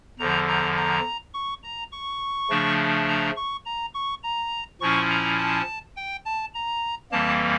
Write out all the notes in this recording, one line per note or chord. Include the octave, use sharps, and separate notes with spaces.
E2 D3 F3 A#5
A#5
A#5
C#6
A#5
C#6
C#3 F3 A3 D4
A#5
C#6
A#5
C#6
A#5
A#2 F3 C#4 E4 C#6
A#5
A5
G5
A5
A#5
F2 E3 G3 A#3 A5